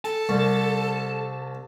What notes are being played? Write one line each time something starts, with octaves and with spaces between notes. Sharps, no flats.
A4 A5
C2